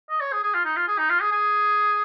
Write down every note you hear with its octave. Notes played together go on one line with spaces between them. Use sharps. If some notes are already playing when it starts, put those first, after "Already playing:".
D#5
C#5
G#4
G#4
F4
D#4
F4
G#4
D#4
F4
G#4
G#4